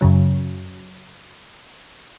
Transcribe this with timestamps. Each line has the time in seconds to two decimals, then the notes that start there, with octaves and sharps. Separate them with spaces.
0.01 F#2 C#3 F#3